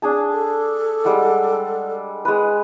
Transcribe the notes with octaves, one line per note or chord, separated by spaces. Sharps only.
D4 G#4 A5
A4
G3 G#3 F#5
G#3 B4